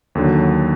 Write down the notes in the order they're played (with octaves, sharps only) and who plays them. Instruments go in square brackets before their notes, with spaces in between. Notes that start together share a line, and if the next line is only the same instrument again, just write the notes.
[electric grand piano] D#2 D3 F#3